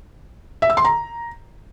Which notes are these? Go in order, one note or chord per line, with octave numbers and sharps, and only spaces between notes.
E5
E6
C6
A#5